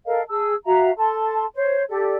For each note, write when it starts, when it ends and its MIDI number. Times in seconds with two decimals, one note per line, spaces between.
0.05 0.21 69
0.05 0.21 70
0.05 0.21 75
0.05 0.21 77
0.28 0.52 68
0.28 0.52 81
0.28 0.52 88
0.65 0.90 66
0.65 0.90 76
0.65 0.90 77
0.65 0.90 82
0.96 1.44 69
0.96 1.44 81
0.96 1.44 84
1.55 1.82 72
1.55 1.82 73
1.89 2.16 67
1.89 2.16 69
1.89 2.16 74